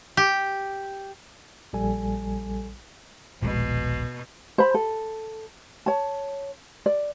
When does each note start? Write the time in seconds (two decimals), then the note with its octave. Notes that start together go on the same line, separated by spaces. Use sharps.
0.17 G4
1.73 A#1 G3 A4 G#5
3.42 D#1 A#1 B2 G#3
4.58 C5 B5
4.74 A4
5.86 C#5 A5
6.86 D5